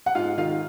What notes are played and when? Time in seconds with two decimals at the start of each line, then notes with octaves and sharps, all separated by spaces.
0.06 F#5
0.15 G#2 F4 F5
0.38 D#3 F4 F5